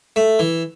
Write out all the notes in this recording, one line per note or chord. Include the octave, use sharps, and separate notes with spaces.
A3
E3